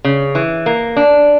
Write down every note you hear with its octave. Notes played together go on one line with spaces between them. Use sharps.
C#3
E3
A#3
D4